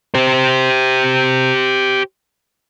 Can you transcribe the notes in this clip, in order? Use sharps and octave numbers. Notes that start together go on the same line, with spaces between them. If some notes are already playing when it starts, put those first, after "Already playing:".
G4 C5